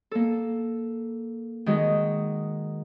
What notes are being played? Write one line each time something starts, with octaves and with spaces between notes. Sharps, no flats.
A#3 A4
D#3 G#3 F#4